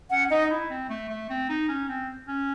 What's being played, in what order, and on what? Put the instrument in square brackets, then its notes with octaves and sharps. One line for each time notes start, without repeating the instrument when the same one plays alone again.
[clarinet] C#4 [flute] F#5
[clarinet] D#4 [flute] D#5
[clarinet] E4
C4
A3
A3
C4
D#4
C#4
C4
C#4